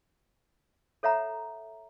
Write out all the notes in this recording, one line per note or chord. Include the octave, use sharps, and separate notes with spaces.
A4 C#5 E5 F#5 A#5